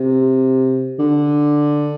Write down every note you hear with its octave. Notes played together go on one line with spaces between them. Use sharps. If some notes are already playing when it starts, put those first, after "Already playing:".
Already playing: C3
D3